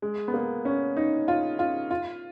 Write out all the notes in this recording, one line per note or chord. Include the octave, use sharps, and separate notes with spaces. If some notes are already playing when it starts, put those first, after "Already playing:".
G#3
B3
A#3
C#4
D#4
F4
F4
F4